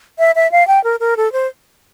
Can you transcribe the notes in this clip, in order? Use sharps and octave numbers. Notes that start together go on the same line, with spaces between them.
E5
E5
F5
G5
A#4
A#4
A4
C5